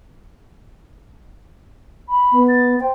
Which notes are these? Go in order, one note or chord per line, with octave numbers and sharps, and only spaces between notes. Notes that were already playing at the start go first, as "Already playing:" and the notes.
B5
B3
A6
C5 G5